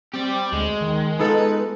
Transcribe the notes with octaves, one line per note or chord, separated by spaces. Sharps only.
C4 G4 D5
D2 G#3
D#3
B3 D#4 F4 A4 B4